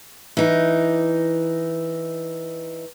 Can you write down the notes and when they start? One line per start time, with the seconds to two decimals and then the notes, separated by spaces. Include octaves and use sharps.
0.37 E3 D#4